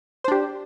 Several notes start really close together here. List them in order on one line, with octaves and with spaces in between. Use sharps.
C5 D4 G4